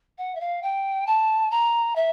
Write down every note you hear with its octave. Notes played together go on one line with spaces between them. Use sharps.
F#5
E5
F5
G5
A5
A#5
E5